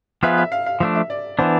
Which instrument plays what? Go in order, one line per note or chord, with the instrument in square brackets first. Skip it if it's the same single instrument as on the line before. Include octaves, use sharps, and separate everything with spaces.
[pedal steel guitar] F3 B3 F4 G#4 B4 [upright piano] E5
[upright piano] E5
F5
F5
[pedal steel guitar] F3 A3 D4 [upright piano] E5
[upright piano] E5
D5
[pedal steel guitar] E3 B3 D4 [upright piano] C5